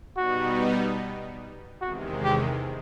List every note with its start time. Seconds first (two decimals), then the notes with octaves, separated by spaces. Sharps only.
0.17 B2 G3 B3 D#4 F#4
1.81 E2 C3 D#3 G#3 F#4
2.23 G4